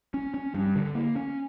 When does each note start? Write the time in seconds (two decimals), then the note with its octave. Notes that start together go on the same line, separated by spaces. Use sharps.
0.14 C#4
0.34 C#4
0.55 G2
0.76 D3
0.95 A#3
1.16 C#4